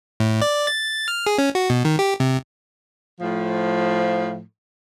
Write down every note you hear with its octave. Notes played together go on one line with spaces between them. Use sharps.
A2
D5
A6
F6
G#4
C#4
F#4
B2
D#3
G4
C3
A2 F3